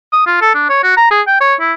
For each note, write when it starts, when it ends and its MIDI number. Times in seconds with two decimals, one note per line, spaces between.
0.13 0.24 87
0.26 0.40 65
0.41 0.52 69
0.55 0.65 62
0.69 0.80 73
0.84 0.93 66
0.97 1.08 82
1.11 1.21 68
1.27 1.36 79
1.41 1.55 73
1.60 1.73 64